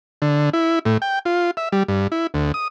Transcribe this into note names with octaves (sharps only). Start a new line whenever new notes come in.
D3
E4
A2
G5
F4
E5
G3
G2
E4
D2
D#6